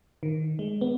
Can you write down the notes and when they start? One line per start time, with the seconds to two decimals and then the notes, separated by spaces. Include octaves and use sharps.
0.23 D#3
0.59 G#3
0.81 B3